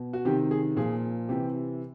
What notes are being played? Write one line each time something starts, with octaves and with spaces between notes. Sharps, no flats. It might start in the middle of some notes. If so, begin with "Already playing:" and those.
Already playing: B2
F#4
C3 D#3 G4
G#4
A#2 F3 G#4
C3 E3 G4